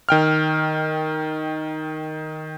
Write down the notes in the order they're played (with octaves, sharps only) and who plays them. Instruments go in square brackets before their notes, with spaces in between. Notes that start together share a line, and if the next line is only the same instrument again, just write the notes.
[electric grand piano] D#3 G5 F6